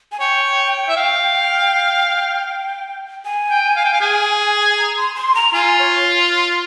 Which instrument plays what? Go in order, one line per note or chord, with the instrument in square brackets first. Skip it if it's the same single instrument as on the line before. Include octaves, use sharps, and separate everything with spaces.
[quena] G#5
[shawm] C#5 [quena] G5
[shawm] E5
F5
[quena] G#5
[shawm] G5
F5
G5
F5
G#4
[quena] A#5
C6
C6
A#5
[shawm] F4 [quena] G#5
[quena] C#5